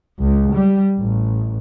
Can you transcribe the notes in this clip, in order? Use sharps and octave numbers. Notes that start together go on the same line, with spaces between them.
C#2
G3
A1